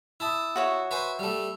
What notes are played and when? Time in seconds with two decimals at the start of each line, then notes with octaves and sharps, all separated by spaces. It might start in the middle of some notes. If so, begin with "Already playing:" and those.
0.20 E4 A5 D#6
0.56 F#4 C#5 E5
0.91 B4 C5 G#5
1.19 G3 A3